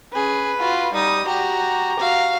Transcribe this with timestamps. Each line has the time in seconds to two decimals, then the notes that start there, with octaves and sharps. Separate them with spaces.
0.14 C#4 G#4 B4
0.56 F4 F#4
0.93 G3 D#4 D#6
1.26 F#4 G4 A#5
1.99 F#4 F5